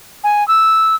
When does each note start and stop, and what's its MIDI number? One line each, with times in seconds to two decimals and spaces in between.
0.24 0.46 80
0.48 0.95 88